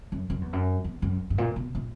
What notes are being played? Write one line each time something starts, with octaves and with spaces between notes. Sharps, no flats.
F#2
F#2
E2
F#2
E2
F#2
G2
A#2
B2
A#2